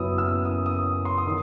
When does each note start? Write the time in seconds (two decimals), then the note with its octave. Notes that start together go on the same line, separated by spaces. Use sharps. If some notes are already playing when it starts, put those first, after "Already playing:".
Already playing: F#1 F#2 F#3 B3 E4 D#6 E6
0.18 E6
0.45 D#6
0.66 D#6
1.05 C6
1.18 D#6
1.27 D#3